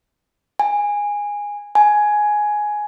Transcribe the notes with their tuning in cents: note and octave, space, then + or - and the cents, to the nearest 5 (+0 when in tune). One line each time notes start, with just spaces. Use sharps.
G#5 -15
G#5 +10